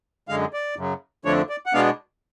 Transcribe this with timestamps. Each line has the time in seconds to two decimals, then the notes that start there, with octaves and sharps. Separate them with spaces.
0.28 F#2 D3 G#3 F5
0.53 D5
0.76 F#2 C#3 F#3
1.25 F2 D3 F3 A3 D4 C#5
1.49 D5
1.66 F#5
1.73 B2 G#3 B3 D4 F5